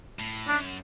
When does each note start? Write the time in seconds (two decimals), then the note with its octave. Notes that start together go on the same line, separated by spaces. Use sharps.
0.19 A2
0.48 F#2 D4